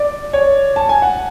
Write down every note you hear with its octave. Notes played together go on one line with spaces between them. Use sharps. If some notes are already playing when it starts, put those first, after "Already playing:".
Already playing: D5
C#5
A5
G#5
F#5